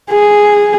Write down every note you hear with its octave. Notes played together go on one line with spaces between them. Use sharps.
G#4